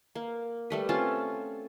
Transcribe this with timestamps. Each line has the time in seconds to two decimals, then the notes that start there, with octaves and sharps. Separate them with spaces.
0.15 A#3
0.70 G3 A3 B4
0.89 C4 C#4 F4 A5